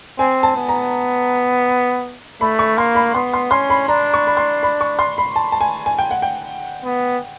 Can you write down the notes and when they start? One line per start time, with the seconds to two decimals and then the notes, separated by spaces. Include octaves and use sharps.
0.19 C4 G#5
0.43 A5
0.56 B3
0.69 A#5
2.41 A3 B5
2.59 C#6
2.77 A#3 C6
2.95 B5
3.15 B3 C6
3.34 C6
3.51 C#4 C6
3.70 B5
3.88 D4 A#5
4.14 C#6
4.27 B5
4.37 C6
4.63 B5
4.81 C#6
4.99 C6
5.18 B5
5.36 A5
5.52 A5
5.61 G#5
5.86 G#5
5.98 G5
6.11 F#5
6.22 G5
6.85 B3